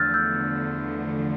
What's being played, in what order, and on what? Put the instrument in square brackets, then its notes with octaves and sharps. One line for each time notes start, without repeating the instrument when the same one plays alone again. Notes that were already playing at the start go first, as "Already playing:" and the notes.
Already playing: [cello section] E2 D3 F3 A3 [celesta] E6 F6 G6 A6
[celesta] E6 G6